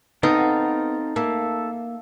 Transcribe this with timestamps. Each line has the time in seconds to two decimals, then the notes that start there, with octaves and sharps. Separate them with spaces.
0.23 B3 C4 D#4 A4 F5
1.16 A#3 A4 E5